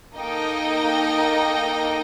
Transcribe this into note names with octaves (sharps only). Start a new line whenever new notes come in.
A#3 D#4 A4 D#5 G5